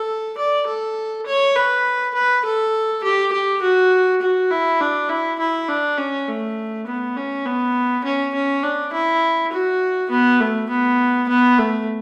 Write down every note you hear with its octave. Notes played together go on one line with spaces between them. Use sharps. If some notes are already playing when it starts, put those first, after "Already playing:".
Already playing: A4
D5
A4
C#5
B4
B4
A4
G4
G4
F#4
F#4
E4
D4
E4
E4
D4
C#4
A3
B3
C#4
B3
C#4
C#4
D4
E4
F#4
B3
A3
B3
B3
A3